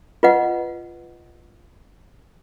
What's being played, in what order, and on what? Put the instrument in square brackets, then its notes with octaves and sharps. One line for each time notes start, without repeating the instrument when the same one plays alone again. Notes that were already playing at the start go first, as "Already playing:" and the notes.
[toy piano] F4 B4 D#5 F#5